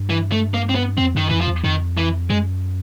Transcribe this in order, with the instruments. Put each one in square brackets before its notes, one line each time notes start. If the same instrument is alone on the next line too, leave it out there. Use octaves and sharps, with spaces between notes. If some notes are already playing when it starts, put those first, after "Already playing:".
Already playing: [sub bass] G2
[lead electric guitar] E3
A3
A#3
C4
B3
[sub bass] F2 [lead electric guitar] C4
[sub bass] F#2 [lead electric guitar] D#3
[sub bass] F2 [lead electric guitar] E3
[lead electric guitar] F3
[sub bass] E2
[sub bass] F2 [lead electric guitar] D#3
[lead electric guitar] E3
[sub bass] F#2 [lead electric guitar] G#3